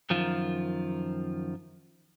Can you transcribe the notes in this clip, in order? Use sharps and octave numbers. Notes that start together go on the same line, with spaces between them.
F#2 D#3 F3 F4